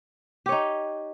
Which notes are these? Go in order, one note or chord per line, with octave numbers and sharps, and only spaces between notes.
D#4 G4 C#5